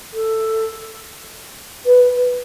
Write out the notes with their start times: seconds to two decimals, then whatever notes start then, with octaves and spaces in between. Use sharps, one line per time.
0.13 A4
1.86 B4